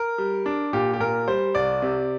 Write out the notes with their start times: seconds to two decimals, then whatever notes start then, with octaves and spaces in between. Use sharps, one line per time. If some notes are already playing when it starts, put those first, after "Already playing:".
Already playing: A#4
0.18 G3
0.46 D4
0.73 A#2 G4
0.93 G4
1.00 A#2 A#4
1.28 G3 C5
1.55 C2 D5
1.82 C3